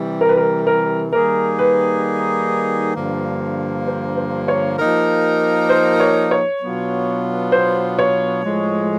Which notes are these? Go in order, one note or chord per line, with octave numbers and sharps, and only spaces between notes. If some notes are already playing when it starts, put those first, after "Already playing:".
Already playing: C3 E3 G3
A#4
B4
A#4
A#4
D#3 G3 A#3 D#4 G#4 A#4
B4
G2 D3 F3 A#3
C5
C5
C#5
F3 A#3 D#4 G4 A#4
C5
C#5
C#5
B2 F#3 B3 D4 F4
C5
C#5
A2 F3 G#3